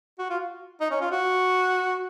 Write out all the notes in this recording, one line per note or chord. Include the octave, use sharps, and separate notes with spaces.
F#4
F4
D#4
C#4
F4
F#4